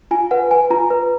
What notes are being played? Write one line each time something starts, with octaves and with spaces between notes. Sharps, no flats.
F4 G#5
B4 F#5
B4 G#5
F4 A#5
B4